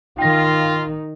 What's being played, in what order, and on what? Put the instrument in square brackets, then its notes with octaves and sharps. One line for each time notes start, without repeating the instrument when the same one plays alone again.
[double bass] D#3 D#4 [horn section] F4 [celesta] G5 A#6